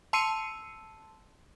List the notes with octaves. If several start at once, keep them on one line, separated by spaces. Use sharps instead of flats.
A5 C6 E6 C7 C#7 D#7